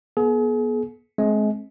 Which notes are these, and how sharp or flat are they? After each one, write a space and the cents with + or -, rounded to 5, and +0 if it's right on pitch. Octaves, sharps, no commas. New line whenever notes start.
B3 -30 G#4 +40
G#3 +35 C4 +35